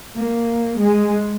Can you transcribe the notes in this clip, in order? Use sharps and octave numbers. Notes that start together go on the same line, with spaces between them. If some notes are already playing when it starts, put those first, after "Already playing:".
A#3
G#3